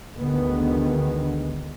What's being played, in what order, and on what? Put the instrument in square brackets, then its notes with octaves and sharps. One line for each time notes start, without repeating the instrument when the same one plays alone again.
[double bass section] D2 D3 D#3 G#3 B3